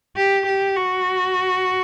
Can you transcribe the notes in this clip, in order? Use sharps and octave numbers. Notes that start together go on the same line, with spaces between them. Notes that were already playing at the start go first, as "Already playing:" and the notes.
G4
G4
F#4